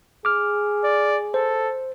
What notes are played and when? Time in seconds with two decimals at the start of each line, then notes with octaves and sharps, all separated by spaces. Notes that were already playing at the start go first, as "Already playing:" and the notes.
0.25 G#4 D6 F6
0.84 D5
1.34 A4 C5